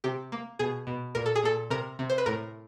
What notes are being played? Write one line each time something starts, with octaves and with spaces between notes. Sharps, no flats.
C3 G4
A#3
B2 G#4
B2
A#2 A#4
A4
G#4
A#2 A4
C3 A#4
C3
C5
B4
A2 A#4